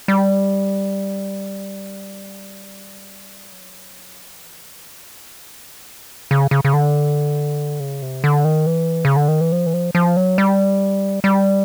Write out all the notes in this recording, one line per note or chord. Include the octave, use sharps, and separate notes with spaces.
G3
F#3
E3
D3
C#3
C#3
C#3
D3
C#3
C3
D3
D#3
E3
C#3
D3
D#3
E3
F3
E3
F3
F3
F#3
G3
G3